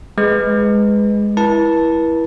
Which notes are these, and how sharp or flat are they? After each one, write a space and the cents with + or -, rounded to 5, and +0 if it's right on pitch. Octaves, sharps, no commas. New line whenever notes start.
G#3 +0 B4 +10
E4 +0 B4 -40 A5 +0